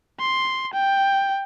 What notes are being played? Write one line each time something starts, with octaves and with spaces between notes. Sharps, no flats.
C6
G5